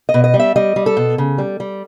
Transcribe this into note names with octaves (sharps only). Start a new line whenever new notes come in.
D#5
B2
D#5
G3
E5
G3 D#5
G3
A4
B2
C#3
G3
G3